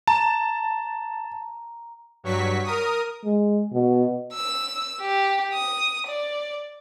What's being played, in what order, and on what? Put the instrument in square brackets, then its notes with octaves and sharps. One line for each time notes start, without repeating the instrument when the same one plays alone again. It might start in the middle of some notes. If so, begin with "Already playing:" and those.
[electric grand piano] A5 [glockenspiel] A#5
[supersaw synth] G2 F#3 C#6 B6
A#4 D#6
[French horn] G#3
B2
[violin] E6
G4
D#6
D5